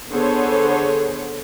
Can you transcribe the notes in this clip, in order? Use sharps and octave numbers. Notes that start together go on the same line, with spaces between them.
D3 B3 G#4 A4 C5 C#5